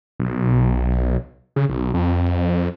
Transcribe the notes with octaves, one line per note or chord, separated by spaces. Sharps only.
B1
C#3
B1
F2